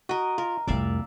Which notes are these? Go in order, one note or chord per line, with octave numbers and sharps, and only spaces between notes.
F#4 A#4 D#5
F4 A#4
C2 F2 A3 D5 E5 F5